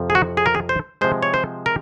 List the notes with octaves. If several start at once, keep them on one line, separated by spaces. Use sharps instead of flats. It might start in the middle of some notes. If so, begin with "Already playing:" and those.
Already playing: F2 C3 F3
G#4
F#4
G#4
A#4
G#4
C5
C3 F3 G#3 C5
C#5
C5
A#4